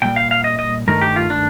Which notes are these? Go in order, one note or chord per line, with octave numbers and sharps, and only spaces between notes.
A#2 G3 G5
F5
F5
D#5
D#5
G2 D#3 A3 A#4
G4
F4
D4